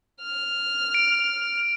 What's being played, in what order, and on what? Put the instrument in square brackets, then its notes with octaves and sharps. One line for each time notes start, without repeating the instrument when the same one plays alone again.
[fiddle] F6
[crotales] D7